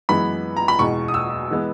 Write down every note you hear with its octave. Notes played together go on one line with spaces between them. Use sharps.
F#2 E3 G#3 B3 B5
A#5
B5
E2 B2 G#3 C#6
D#6
E6
E3 G#3 B3